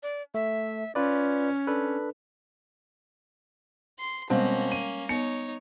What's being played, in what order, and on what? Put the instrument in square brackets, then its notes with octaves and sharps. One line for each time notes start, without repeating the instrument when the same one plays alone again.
[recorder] D5
[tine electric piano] A3 [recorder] E5
[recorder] C#4 [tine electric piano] F4 B4 D5
[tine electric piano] D4 A4 B4
[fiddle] C6
[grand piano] B2 C4 [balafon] G3 G#3 F5 [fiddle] A#3 C#4
[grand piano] D#7
[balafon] B3 [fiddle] D#4 C#5 [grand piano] C#7